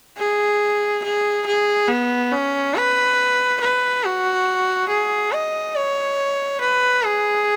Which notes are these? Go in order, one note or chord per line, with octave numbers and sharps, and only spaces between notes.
G#4
G#4
G#4
B3
C#4
B4
B4
F#4
G#4
D#5
C#5
B4
G#4